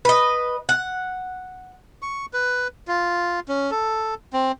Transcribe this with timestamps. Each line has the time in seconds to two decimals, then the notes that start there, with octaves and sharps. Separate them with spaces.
0.05 B4 D#5
0.69 F#5
2.02 C#6
2.33 B4
2.88 F4
3.48 C#4
3.71 A4
4.33 C4